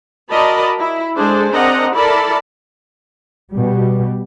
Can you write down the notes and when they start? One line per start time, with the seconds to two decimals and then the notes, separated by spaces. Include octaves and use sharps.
0.31 F#4 A#4 D5 D#5 A5 B5
0.80 E4
1.17 G#3 D4 G#4 A4 C5 D5
1.52 C4 D4 A#4 D#5 F#5 A#5
1.94 E4 A4 A#4 D5 A5 B5
3.52 B2 G3